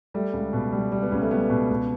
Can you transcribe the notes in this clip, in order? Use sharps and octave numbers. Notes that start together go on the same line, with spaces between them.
G3 A3
C#2
B2
G3
G3
B3
C#2 C#4
A3
G3 B3
B2
C#2